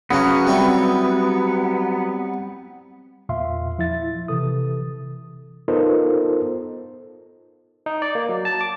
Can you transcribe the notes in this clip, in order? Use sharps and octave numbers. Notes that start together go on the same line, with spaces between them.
C#3 F#3 B3 C#4
G3 C4 E4
E2 A#2 E5 F5 C6
F3 E4 E5 A6
C3 E3 A4 D#6
B3 D#4 F4 A4 A#4 C5
D#4
D5
A#3
F#3
A5
D6